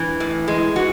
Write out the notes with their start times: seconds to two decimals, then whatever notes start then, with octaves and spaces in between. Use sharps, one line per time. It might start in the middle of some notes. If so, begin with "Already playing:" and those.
Already playing: E3
0.20 A2
0.48 E3 G#3
0.76 E3 F#4